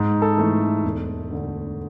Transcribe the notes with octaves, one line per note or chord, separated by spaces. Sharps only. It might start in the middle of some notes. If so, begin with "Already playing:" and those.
Already playing: G#2
A4
E3 A3
E1
D2 D3